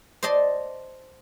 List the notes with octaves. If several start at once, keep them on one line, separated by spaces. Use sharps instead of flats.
C5 D5 D#5 A5 C6